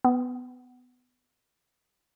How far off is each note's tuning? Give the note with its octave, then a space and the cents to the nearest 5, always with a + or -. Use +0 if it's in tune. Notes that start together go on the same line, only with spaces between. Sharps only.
B3 +15